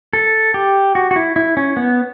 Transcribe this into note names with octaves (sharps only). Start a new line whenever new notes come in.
A4
G4
F#4
F#4
E4
E4
C#4
B3